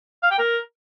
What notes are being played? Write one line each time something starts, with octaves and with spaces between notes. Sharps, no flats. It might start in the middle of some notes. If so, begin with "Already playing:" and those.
F5
G5
A#4